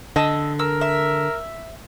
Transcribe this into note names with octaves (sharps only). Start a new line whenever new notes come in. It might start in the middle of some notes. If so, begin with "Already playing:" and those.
D3 D#5 A5 E6
A#4 E6
E5